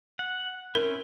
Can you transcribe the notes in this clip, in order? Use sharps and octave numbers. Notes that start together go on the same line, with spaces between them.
F#5
C4 C#4 E4 A#4